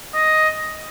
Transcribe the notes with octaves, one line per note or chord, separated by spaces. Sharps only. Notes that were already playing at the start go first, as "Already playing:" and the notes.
D#5